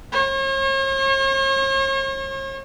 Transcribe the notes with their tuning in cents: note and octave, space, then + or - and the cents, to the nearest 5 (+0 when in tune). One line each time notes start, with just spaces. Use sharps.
C#5 -45